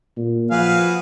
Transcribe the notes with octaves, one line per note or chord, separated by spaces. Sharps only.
A#2
F3 F#4 G#4 B4 F5